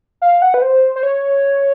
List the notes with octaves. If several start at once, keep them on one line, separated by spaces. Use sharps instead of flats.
F5
F#5
B4
C5
C5
C#5